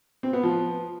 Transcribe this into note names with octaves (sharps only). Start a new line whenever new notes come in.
C4
B3
F3